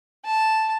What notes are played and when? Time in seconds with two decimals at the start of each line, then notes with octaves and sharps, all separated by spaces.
0.25 A5